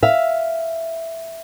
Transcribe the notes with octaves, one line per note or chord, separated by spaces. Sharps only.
E5 F5